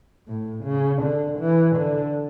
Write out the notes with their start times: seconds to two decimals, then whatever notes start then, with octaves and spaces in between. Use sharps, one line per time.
0.28 A2
0.65 C#3
1.02 D3
1.39 E3
1.77 D3